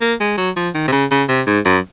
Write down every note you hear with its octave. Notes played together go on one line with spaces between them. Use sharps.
A#3
G#3
F#3
F3
D#3
C3
C#3
C#3
C3
G#2
F#2